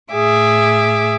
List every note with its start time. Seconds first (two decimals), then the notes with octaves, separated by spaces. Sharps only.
0.12 A2 G#4 E5 D6